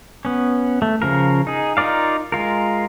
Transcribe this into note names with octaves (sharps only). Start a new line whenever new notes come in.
B3 C#4
A3
C#3 F3 A#4
D#4 G#4
D#4 F4 A#4 D5 F5
G#3 F4 A#4